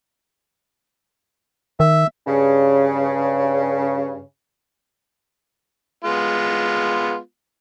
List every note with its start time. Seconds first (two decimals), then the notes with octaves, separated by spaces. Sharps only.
1.80 D#3 E5
2.26 G2 C#3
6.04 G#3 B3 F4